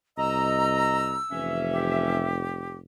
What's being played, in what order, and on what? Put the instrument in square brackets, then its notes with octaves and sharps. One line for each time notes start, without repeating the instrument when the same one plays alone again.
[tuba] C2 [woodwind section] D#5 A#5 [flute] E6
[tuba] F1 [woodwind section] E3 C#4 E5
[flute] G4